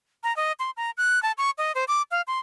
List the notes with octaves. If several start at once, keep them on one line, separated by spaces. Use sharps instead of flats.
A#5
D#5
C6
A#5
F#6
A5
C#6
D#5
C5
D6
F5
C6